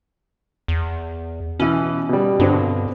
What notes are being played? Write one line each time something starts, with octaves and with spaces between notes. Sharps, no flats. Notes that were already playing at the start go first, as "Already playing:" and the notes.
E2
B2 E3 C#4
B2 G3
G2 B2 D3 C4